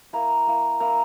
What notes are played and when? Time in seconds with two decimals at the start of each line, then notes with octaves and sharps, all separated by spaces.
0.13 A#3 E4 A#5
0.47 A#3 E4
0.80 A#3 E4 A#5